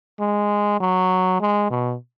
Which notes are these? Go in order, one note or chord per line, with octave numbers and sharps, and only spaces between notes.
G#3
F#3
G#3
B2